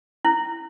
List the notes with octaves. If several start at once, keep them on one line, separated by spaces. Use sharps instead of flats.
E4